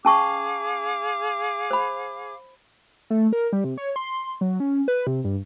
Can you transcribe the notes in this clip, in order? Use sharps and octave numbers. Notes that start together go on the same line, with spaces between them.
C#4 G#4 F5 A5 C#6 D6
C5 B5
A3
A#4
G3
C3
C#5
C6
F#3
C#4
B4
C3
G2